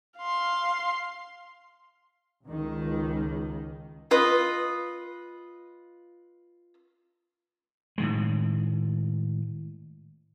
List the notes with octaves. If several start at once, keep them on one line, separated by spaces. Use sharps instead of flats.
F5 C6
C#2 D#3
F4 B4 D#5
A2 D#3 G#3